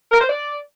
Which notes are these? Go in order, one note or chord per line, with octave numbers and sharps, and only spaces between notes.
A#4
C5
D5